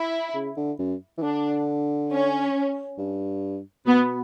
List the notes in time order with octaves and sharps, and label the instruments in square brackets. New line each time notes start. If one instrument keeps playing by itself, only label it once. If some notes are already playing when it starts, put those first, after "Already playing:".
Already playing: [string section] E4
[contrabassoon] C#3
D3
F#2
E3
[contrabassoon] D3 [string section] D4
[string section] C#4
[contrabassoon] G2
[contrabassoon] B2 [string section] B3